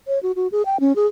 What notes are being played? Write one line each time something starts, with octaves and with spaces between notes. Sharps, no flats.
C#5
F#4
F#4
G#4
G5
C#4
G#4